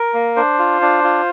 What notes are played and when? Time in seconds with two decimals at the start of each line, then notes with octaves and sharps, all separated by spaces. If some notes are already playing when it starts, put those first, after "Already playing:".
Already playing: A#4
0.14 A#3
0.36 D4 C5
0.59 F4
0.82 D4
1.04 F4